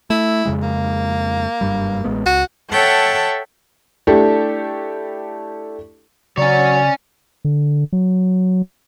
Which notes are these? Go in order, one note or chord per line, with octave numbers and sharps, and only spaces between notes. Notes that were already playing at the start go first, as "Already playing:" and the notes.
A3 E4
F2 C#3 G#3
A#3
F#1 G2 G3
A1 G#3 B3
C#2 F#4
A4 C#5 E5 F#5 G5 A5
A3 D4 E4 G4 A4
C#3 F#3 C#4 C#5 D5
D3
F#3